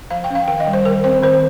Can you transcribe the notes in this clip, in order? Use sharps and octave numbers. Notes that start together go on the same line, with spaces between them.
F3 F5
G5
C#4
F5
D#3 G5
D#5
G3
C5
D#3 A#4
C4 C5
D#3 C5